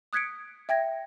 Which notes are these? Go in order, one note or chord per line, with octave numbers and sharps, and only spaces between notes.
D#6 F#6 G#6 B6 C#7 D7
E5 G5 G#6 A#6